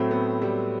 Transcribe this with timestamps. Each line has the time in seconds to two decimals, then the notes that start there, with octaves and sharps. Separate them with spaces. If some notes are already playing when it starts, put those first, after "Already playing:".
Already playing: A2 F#3 A3 C4
0.11 B3
0.42 G3